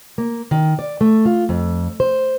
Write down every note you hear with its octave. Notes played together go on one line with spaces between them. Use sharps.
A#3
D#3
D5
A3
F4
F2
C5